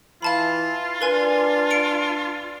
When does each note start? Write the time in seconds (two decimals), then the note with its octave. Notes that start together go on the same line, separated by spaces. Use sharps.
0.22 E3 F4 F5 A5 B5
1.01 D4 A#4 B4 G#5
1.70 C#7 D7 F7